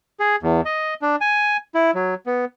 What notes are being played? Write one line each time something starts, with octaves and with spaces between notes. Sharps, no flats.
G#4
E2
D#5
D4
G#5
E4
F#3
B3